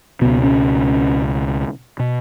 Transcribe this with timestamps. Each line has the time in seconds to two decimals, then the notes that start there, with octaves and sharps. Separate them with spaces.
0.21 C#2 B2 B3
0.43 C#4
1.99 B2